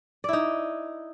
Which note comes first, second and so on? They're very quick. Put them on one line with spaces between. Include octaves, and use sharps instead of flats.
D5 E4 D#4